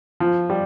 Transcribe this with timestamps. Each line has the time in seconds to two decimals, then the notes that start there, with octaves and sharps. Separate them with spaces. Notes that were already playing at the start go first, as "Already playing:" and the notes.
0.20 F3
0.50 G3